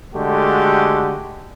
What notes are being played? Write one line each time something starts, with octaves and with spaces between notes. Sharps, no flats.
D3 G#3 A3 F#4 G4